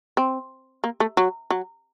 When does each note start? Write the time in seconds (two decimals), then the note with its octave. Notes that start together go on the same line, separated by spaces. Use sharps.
0.17 C4
0.84 A#3
1.00 A3
1.17 F#3
1.50 F#3